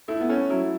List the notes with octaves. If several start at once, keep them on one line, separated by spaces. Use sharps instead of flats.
A3 E4
B3
A3 C#4
F#3 E4